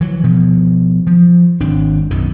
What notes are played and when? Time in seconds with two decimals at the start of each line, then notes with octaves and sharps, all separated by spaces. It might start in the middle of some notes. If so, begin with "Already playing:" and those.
0.01 E3 F#3
0.23 B2 F3
1.07 F3
1.60 G#1 C4 D4
2.11 B1 F#2 B2 D#3